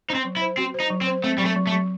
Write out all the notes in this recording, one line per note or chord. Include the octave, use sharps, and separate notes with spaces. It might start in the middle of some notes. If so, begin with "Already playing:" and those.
D#4 C5
C4
F#3
E4
C5
C4 F#4
C5
D#4
F#3
C4
C5
A3 C4
F#3 G3
A3
F#3
A3
F#3